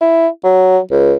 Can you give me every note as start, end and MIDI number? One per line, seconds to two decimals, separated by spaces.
0.01 0.28 64
0.44 0.79 54
0.91 1.15 37